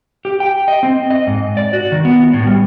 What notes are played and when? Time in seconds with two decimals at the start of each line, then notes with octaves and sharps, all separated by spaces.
0.25 G4
0.40 G5
0.68 D#5
0.83 C4
1.10 D#5
1.27 G#2
1.57 D5
1.73 F#4
1.92 D#3
2.05 B3
2.33 A2
2.46 G3